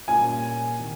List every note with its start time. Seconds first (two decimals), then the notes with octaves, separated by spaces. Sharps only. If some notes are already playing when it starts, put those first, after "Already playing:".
0.08 A#2 G3 A#3 C#4 F4 G#5
0.79 C3 D#3